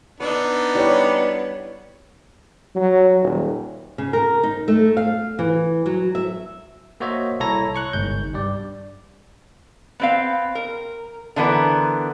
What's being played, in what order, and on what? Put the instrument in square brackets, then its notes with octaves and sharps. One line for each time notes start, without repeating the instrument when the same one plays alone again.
[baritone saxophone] B3 [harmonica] D4 D#4 [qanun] B4 E5
[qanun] G3 [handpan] E4 C#5
[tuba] F#3
D#1
[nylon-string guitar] C#3
A#4
D#4
A3
F5
E3
F#3
E5
[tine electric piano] A#3 F#4 C5 C#5 D#5 E5
C2 E4 A4 C#5 A#5 A#6
C#5 C#6 F#6
G1 C2 G#2 G6
G2 G3 D5
[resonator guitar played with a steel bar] B3 C4 F5
A#4
D3 E3 B3 A#4